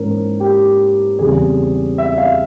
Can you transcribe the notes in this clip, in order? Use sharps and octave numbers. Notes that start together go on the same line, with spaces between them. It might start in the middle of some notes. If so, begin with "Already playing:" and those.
Already playing: G#2 E3 A#3 C#4 A#4
G4
E2 C#3 G3 C4 G#4
E5
F5